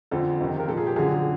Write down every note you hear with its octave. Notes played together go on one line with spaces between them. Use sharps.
F2 D3 F3 A4
F2 C3 D#3
A#4
A#2 F3 A4
G#4
G4
F#2 D3 F3 G#4